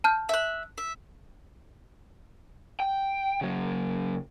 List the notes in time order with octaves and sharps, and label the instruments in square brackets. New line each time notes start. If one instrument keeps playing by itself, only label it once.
[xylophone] A5 F6 G6
[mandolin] E5 F#6
E5
[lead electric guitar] G5
C#3 F#3